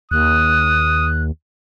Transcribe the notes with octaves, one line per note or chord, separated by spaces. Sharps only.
D#2 D#6 F#6